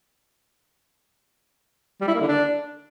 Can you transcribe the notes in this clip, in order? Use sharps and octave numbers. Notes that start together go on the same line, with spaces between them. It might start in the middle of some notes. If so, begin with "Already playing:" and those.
G3
E4
A#3
D3
D4